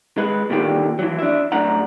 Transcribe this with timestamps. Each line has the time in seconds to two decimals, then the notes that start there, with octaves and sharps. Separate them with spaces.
0.18 G#3 B4
0.50 A#2 D3 D#3 G4
0.99 E3 F#3
1.19 D4 E5
1.52 F#2 A2 D4 F#5 A#5